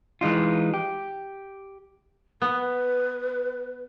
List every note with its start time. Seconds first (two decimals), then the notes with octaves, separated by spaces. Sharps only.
0.21 E3 G#3 D#4 F4
0.74 G4
2.42 B3 B4